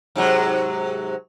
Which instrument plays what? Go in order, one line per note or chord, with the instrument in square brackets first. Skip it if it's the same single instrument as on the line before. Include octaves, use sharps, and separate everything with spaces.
[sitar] G#2 C3 F#3